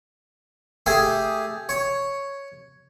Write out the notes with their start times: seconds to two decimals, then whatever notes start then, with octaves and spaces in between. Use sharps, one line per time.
0.86 A3 G4 G#4 G#5
1.69 C#5